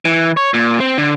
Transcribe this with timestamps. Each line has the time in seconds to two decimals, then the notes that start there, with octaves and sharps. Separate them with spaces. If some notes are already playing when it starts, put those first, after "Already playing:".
0.05 E3
0.37 C#5
0.54 A#2
0.80 C4
0.98 D3